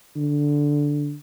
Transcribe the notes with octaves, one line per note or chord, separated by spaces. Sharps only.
D3